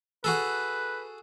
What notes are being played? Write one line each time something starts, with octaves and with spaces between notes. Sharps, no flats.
F#4 G#4 A4 B4